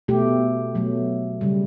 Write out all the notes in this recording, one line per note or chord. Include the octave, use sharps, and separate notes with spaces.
B2 A3 G4
B2 F#3 A3
C#3 G3